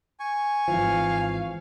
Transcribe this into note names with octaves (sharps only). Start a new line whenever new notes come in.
G#5 C#6
G#1 E3 F3 F5